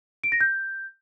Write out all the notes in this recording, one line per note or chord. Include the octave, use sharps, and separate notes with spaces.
D7
A#6
G6